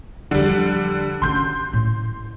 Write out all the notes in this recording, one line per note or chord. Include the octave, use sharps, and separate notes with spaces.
E2 D3 F3 G3
D3 C#4 C6 G6
A2